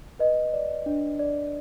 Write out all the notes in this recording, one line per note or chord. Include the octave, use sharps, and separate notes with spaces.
B4 D#5
D5
D4
D5